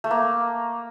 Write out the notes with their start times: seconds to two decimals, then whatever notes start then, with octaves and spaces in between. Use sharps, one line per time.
0.04 A3
0.11 A#3